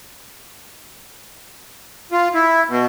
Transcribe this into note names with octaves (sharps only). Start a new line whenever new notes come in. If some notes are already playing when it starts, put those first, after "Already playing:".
F4
E4
B2